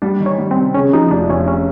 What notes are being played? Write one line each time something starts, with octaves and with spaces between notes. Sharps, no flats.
G3 D4
D#3
C#4
G3
C4
C3
C#3 C#4
F3 D#4
F1 D4
F1 C#4
C#4